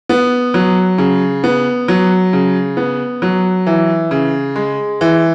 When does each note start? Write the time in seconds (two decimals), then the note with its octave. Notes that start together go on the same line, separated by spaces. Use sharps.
0.09 B3
0.54 F#3
0.98 C#3
1.44 B3
1.88 F#3
2.33 C#3
2.77 B3
3.22 F#3
3.67 E3
4.11 C#3
4.56 G#3
5.01 E3